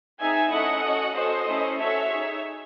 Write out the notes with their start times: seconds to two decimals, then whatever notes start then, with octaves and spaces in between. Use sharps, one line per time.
0.19 C4 D#4 G#4 E5 G#5
0.51 A3 C#4 E4 A4 D#5 F#5
0.83 C#4 F#4 A4
1.15 C#4 F#4 A4 C5 D#5
1.47 A3 C#4 E4
1.79 C#4 F#4 A4 C#5 E5
2.11 D#4 G#4